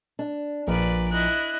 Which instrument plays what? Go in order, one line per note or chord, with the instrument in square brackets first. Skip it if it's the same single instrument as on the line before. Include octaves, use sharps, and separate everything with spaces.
[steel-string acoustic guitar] D4
[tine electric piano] A#1 F3 [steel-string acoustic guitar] A#2 [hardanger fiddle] B4 D5
[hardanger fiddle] E4 D#5 [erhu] F#6